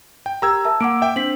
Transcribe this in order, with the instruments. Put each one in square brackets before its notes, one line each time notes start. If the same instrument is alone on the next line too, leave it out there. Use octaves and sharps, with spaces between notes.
[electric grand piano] G5
[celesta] G4 A#4 G5 [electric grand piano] A#5 E6 G#6
[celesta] A#4 E5 A5
[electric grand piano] A#3 [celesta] F#5 D6 D7
[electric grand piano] E5 G5
[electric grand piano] C4 [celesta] D4 B6 F#7